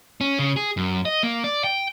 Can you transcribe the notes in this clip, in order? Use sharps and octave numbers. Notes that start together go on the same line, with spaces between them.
C#4
C#3
G#4
F#2
D#5
A#3
D5
G5